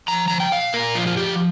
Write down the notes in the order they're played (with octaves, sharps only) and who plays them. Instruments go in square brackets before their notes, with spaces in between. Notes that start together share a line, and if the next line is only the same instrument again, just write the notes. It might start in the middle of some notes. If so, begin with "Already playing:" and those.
[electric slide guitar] F3 A#5
F3 A#5
G5
A#2 F5
A#2 A#4
F3 F4
F4
F3 G4